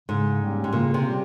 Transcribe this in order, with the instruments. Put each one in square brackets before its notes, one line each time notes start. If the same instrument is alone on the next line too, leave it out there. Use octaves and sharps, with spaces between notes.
[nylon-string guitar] G#2 [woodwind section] C#3
[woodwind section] G3 A#3 C#4 G4
[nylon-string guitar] G#2
[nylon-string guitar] A#2 [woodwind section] C#3
[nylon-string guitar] C3
[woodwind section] G3 A#3 C#4 G4